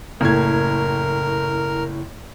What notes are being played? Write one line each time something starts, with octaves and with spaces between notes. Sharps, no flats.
F#1 A2 A#4 G#6